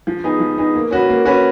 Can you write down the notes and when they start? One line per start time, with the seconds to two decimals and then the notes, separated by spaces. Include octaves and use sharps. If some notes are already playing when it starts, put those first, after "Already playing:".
0.07 F3
0.24 B3 D#4 G#4
0.40 F3
0.58 B3 D#4 G#4
0.75 A#3
0.91 C#4 F#4 B4
1.09 A#3
1.25 C#4 F#4 B4